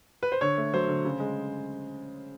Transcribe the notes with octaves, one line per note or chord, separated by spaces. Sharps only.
B4
C5
D3 C#5
A3
F#3 C5
D3
C#3
G#3